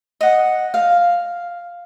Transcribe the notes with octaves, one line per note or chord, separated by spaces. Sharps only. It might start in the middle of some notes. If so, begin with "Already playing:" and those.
D#5 F#5
F5